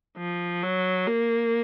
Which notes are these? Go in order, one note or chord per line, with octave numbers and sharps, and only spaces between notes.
F3
F#3
A#3